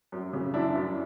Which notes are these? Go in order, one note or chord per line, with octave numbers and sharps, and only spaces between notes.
F#2
C#3
F#2 D4 E4
F#2